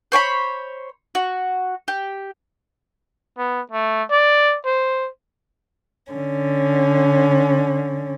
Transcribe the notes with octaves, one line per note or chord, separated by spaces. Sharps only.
C5 C#5 G#5 B5
F#4
G4
B3
A3
D5
C5
D3 C#4